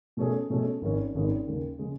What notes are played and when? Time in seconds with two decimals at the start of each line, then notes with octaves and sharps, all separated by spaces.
0.17 B2 A3 C#4 G#4
0.50 B2 A3 C#4 G#4
0.82 G#1 G#2 D#3 G#3 C#4
1.14 G#1 G#2 D#3 G#3 C#4
1.47 D#2 C#3 G#3
1.79 C#3 G#3